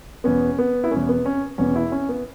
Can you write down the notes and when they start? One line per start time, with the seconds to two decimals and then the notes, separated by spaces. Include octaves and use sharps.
0.24 E2 B2 B3 C#4
0.59 B3
0.84 E4
0.91 E2 B2 B3 C#4
1.09 B3
1.26 C#4
1.58 E2 B2 B3 C#4
1.76 E4
1.92 C#4
2.09 B3